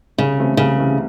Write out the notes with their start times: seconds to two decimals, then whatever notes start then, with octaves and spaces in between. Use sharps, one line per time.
0.18 C2 C#3
0.38 C3 E3 A3 C4
0.57 C2 C#3
0.78 C3 E3 A3 C4